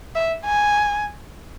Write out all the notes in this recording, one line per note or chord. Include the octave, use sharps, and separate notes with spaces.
E5
G#5